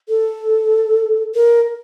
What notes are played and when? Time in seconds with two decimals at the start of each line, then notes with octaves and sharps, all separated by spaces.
0.09 A4
1.35 A#4